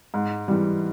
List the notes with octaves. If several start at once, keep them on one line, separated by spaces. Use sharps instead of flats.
G#2
E3 G3